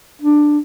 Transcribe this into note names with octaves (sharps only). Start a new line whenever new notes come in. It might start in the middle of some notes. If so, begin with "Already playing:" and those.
D4